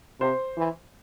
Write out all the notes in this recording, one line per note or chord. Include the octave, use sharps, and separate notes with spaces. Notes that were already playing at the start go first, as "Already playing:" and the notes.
C3 C5
E3